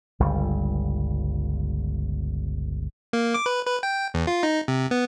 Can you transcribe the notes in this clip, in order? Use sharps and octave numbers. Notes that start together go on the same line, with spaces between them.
G1 C#2 G3
A#3
D6
B4
B4
G5
E2
F4
D#4
C3
B3